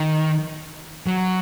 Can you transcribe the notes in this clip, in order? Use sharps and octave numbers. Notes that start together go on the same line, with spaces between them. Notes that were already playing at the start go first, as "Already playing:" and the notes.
Already playing: D#3
F#3